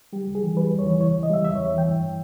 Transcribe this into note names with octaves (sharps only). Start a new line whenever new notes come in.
G3 G4
C#2
G#4
E3
G3 B4
E2
C#5
E3
C#2 C#5
C#2
D#5
G3 E5
E2 E5
C#5
E2
E3 G5
G2